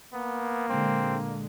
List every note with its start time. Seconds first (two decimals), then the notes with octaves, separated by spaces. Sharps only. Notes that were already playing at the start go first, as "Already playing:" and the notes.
0.13 A#3 B3
0.69 A#2 D3 G#3 C4